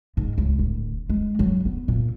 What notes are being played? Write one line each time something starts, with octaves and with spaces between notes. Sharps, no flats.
G#2
C#2
D1
G#3
F#3
B3
A#2